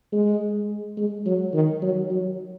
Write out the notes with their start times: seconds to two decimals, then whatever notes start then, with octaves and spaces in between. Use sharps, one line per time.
0.12 G#3
0.98 G#3
1.26 F#3
1.54 D#3
1.82 F#3
2.11 F#3